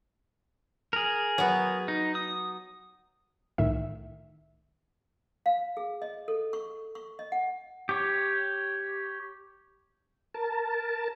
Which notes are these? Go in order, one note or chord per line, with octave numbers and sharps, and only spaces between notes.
G#4 A#4
F#3 B3
D#4
D#6
C2 A2 D#3 E5
F5
G#4
D#5
A4
C#6
C#6
D#5
F#5
G4 C#5
A#4 A5